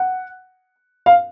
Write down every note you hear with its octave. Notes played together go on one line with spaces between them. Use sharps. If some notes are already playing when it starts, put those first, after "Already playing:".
Already playing: F#5
F5